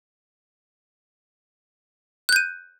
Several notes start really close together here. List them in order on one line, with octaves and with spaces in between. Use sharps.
F#6 G6 D#7